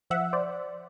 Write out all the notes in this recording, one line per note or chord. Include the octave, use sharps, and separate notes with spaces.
F3 E5 F#5
C5 D5